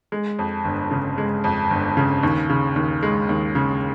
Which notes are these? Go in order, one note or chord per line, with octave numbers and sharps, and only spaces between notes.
G#3
F2
G1
C#3
G#3
F2
G1
C#3
D#2
C#3
D#2
G#3
D#2
C#3